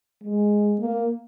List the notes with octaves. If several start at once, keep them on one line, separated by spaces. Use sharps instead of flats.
G#3
A#3